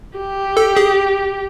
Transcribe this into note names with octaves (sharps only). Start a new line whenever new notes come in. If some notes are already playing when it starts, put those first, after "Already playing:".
G4
A4
G#4